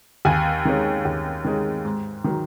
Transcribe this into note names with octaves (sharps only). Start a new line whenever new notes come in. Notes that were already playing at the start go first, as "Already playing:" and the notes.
D#2 G#5
D#3 G#3 C#4
D#2
D#3 G#3 C#4
G#2
D#3 F#3